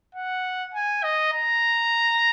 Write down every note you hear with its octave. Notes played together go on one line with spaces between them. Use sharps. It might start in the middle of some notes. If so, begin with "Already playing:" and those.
F#5
G#5
D#5
A#5